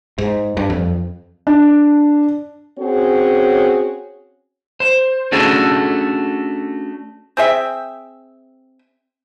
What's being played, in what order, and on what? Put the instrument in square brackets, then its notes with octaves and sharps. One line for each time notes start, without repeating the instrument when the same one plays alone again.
[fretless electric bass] G#2
G2
F2
[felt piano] D4
[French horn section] C4 C#4 F#4 G#4 C#5
[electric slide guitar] C5
A3 C#4 D4 F#4 G#4 A4
[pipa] C4 G#4 E5 G5